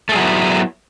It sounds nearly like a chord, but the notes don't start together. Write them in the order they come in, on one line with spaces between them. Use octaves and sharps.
A3 G#4 F#3 E4 B3